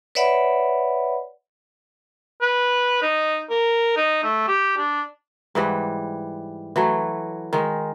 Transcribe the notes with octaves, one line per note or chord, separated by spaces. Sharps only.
B4 C#5 D5 E5 F#5 B5
B4
D#4
A#4
D#4
A3
G4
D4
G#2 E3 G3 F#5
E3 F#3 A3
D#3 G#3